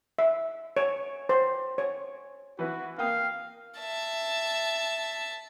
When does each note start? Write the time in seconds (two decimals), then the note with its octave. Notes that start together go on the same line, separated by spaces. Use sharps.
0.19 E5
0.77 C#5
1.29 C5
1.78 C#5
2.59 E3 F#4 B4
2.98 A#3 F5 G5 D#6
3.79 E5 A5